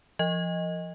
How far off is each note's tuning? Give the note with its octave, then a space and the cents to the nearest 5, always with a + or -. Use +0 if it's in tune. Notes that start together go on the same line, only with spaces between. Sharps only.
F3 -15 D#5 +5